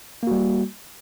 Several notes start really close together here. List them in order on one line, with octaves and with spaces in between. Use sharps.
A#3 F#4 G3